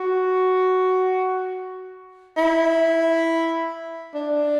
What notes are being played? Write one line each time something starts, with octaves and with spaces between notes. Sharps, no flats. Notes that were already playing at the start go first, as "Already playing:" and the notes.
Already playing: F#4
E4
D4